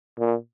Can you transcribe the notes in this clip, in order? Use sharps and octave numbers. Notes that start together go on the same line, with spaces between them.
A#2